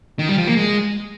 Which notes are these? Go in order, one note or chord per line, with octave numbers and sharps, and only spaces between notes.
D#3
G3
F3
A#3
G#3